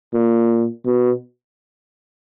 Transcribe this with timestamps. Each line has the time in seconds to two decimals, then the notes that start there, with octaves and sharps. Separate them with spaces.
0.14 A#2
0.86 B2